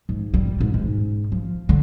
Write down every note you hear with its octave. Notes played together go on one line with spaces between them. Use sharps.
G#2
G3
G#2
G#2
F3
D3